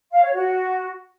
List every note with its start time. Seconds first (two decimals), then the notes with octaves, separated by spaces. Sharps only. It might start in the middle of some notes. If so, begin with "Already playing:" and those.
0.12 F5
0.23 C#5
0.33 F#4